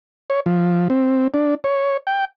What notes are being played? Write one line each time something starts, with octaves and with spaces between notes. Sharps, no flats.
C#5
F3
C4
D4
C#5
G5